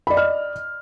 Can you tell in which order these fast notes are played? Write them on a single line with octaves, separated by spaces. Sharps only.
B5 D5 D#5 F6